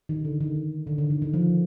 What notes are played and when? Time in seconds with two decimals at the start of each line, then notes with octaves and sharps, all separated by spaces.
0.09 D#3
0.25 D3
0.41 D#3
0.87 D3
0.98 D3
1.10 D#3
1.22 D#3
1.34 F3